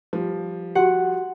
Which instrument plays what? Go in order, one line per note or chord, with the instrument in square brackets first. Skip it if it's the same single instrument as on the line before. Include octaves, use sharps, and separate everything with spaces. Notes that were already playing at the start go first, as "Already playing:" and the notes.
[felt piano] F3 G3
[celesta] F#4 G4 [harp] F#5